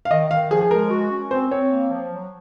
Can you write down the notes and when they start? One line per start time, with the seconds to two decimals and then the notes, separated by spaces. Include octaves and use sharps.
0.05 F5
0.11 D#3 D#5
0.31 D#3 F5
0.51 F3 G#4
0.61 G#4
0.71 G#3 A#4
0.90 F#4
1.11 C#4
1.31 C4 C5
1.51 C4 C#5
1.70 A#3
1.90 F3
2.11 F#3